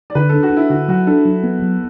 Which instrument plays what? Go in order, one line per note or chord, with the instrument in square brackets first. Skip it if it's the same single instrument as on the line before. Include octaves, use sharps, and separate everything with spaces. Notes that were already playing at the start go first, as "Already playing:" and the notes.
[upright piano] D5
[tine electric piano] D3 [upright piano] B4
[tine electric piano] D4 [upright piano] A4
[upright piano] F#4
[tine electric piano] D4 [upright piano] E4
[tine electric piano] D3 [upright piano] F#4
[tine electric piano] F#3 [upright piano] F#4
[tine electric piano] D4 [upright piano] A4
[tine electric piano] F#3
B3
F#3